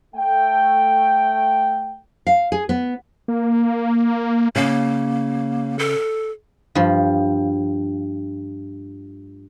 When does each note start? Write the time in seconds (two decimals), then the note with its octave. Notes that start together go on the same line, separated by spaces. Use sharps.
0.15 A3 G5
2.27 F5
2.52 G#4
2.69 B3
3.28 A#3
4.56 C#3 A#3
5.79 A4
6.75 G2 F3